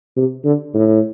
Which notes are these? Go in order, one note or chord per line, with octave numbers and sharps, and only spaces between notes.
C3
D3
A2